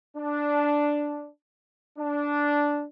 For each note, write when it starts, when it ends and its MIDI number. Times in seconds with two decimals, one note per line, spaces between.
0.17 1.28 62
1.98 2.84 62